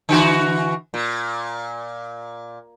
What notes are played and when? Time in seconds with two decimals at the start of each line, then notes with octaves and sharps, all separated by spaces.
0.09 D3 E3 F#4
0.94 A#2